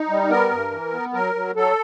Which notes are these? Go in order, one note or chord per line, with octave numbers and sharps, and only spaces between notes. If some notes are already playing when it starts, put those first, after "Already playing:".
Already playing: D#4
G3
B3 A#4
G2
E3
B3
F#3 A#4
F#3
F#3 A4